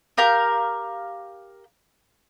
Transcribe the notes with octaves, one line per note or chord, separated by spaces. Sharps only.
G4 A#4 F5 G6